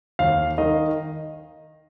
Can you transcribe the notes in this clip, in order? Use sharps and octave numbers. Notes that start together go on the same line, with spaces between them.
D#2 F5
D#3 D#5